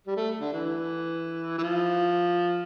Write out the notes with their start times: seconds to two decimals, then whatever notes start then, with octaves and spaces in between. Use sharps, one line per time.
0.07 G3
0.17 A3
0.40 D3
0.53 E3
1.58 E3
1.63 F3